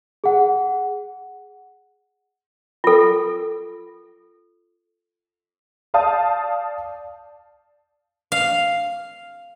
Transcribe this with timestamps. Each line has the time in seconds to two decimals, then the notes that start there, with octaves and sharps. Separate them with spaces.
0.24 G#4 F#5
2.84 F4 A4
5.94 D5 F5 A5 D#6 G6
8.32 F5